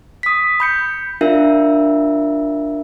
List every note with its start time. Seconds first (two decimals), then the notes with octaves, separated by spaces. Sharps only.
0.23 D#6 B6
0.60 B5 G6 C#7
1.21 D4 F4 A#4 E5